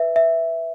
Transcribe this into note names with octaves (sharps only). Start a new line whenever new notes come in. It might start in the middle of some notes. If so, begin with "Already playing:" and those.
Already playing: B4 E5
E5